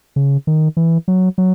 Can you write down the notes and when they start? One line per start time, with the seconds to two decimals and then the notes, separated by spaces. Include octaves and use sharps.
0.16 C#3
0.47 D#3
0.77 E3
1.08 F#3
1.38 F#3